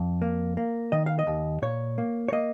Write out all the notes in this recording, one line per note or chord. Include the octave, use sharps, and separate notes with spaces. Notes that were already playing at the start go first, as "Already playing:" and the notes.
Already playing: F2
A#3
A#3
D#3 D#5
F5
D#5
D#2
A#2 C#5
A#3
C#5
A#3 D#5